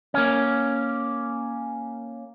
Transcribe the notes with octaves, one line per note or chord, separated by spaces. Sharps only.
A#3 C#4